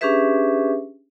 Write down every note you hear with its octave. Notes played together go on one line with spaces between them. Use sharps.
C#4 D4 G4 G#4 B4 E5